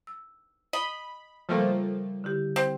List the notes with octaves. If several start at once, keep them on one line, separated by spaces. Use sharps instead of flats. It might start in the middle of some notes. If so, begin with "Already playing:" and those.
E6
D#5 B5
C#3 F3 G3 A3 A#3
D3 E4 G4
C4